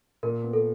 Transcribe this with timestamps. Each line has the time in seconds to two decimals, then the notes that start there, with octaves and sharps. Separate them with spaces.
0.23 A#2 A#4
0.43 B3
0.53 A4